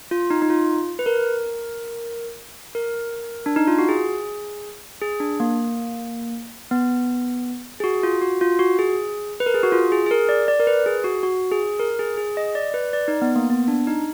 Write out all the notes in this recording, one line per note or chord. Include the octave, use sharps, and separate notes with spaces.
F4
D#4
D#4
F4
B4
A#4
A#4
D4
D#4
F4
F#4
G#4
G#4
D4
A#3
B3
G#4
F#4
F4
F#4
F4
F#4
G#4
B4
A#4
G#4
F#4
F4
G#4
G#4
A#4
D5
D5
A#4
B4
G#4
F#4
F#4
G#4
A#4
G#4
G#4
D#5
D5
B4
D5
D#4
B3
A#3
B3
D4
D#4